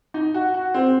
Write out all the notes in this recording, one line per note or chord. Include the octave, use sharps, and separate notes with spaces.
D#4
F#4
F#4
C4